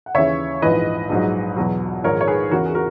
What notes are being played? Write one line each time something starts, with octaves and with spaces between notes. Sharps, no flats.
F#5
D#2 C#3 E3 C#5 E5
A#1 G#2 E3 B4 D#5
A#1 G#2 F#3
E2 B2 F#3
A#1 G#2 D#3 A#4 C#5
C#5
G#4 B4
E2 C#3 E3 F#4 A#4
G#4
F#4 A#4